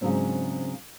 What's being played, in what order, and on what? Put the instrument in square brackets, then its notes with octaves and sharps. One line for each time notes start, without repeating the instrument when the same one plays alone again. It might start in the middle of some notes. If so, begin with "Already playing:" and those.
[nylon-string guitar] G#2 C#3 E3 F#3 C4 D4